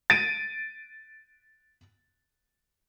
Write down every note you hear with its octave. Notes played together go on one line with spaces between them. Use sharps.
A6 D7 D#7